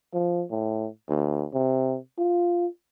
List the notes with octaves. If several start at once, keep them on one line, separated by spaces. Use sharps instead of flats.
F3
A2
D2
C3
F4